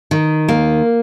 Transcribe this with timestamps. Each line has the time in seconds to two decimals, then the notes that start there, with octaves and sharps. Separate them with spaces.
0.11 D#3
0.48 A#3